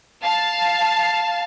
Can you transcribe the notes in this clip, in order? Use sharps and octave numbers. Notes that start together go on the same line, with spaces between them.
F5 A5